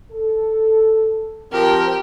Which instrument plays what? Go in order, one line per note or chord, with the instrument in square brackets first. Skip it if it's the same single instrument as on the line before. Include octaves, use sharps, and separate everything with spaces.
[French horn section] A4
[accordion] F3 C4 A#4 [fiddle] G4 G5